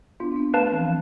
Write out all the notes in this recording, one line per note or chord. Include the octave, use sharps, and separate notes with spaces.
B3 D4 F4
C4
B3 D4
A3 C4 B4 F5 A5
E3
F3